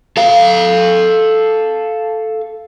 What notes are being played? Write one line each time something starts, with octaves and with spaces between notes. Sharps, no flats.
A4 F5